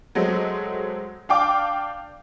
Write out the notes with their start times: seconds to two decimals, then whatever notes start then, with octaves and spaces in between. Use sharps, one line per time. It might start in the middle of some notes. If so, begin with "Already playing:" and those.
0.15 F#3 G#3 A3 C4
1.29 D4 F5 G5 D6